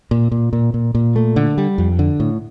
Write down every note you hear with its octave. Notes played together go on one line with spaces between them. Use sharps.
A#2
A#2
A#2
A#2
A#2
A3
D3
G3
F2
D3
A2